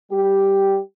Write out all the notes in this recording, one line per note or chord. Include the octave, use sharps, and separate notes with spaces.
G3 G4